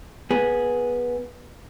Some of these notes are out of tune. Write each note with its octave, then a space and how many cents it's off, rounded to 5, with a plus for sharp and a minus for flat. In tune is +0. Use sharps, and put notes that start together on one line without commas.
B3 -15 G#4 +0